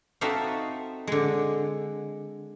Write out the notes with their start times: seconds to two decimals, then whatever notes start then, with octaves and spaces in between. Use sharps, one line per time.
0.21 C4 D#4 F#4 A4 E5 F5
1.07 D3 G#3